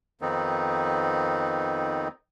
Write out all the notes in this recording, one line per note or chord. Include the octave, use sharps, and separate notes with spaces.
F2 D#3 B3 C4 D#4